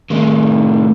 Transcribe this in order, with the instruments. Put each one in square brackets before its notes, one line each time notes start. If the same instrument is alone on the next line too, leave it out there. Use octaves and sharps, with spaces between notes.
[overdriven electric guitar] A2 D#3